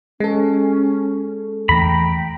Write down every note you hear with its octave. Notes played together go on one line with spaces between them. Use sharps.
G#3 C#4 A4
E2 E3 A3 G5 A#5 B5